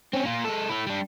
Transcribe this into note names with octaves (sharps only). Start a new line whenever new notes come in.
C4 C#4
A#3 F4
G#3 A4
E4 A4
G3 D4